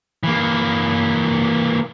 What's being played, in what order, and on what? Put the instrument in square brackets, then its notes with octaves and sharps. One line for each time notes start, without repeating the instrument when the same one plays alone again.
[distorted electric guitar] E3 A#3